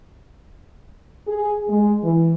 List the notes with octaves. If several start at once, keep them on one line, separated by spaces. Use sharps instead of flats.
G#4
G#3
E3